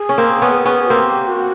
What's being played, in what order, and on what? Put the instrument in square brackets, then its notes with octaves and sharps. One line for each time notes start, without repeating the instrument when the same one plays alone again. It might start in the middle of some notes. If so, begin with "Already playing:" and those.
Already playing: [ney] G#4
[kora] C#4
A#3 C4
B3 C#4
B3 C#4
[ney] F#4
[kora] A#3 C4 [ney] G4
[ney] F#4